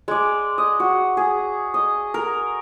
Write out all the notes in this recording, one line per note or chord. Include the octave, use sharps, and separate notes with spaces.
G#3 D5
D#5
F#4
G#4
D#5
A#4